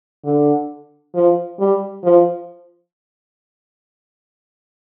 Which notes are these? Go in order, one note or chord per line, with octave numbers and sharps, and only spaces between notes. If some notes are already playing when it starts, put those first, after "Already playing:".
D3
F3
G3
F3